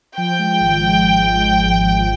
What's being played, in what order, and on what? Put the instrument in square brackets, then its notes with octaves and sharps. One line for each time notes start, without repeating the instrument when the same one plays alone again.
[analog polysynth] F3 [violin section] G5
[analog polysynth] G#3
G#1
G#3
G#1
G#3
G#3
G#1
G#1